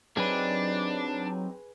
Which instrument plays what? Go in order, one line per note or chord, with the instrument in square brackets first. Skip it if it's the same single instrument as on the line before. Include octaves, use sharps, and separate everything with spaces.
[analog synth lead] F#3 [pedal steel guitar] C4 D#4 G4 [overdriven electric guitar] D4 [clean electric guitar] G#4 B4